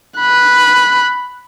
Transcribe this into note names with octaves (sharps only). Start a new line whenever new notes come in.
B5 F#6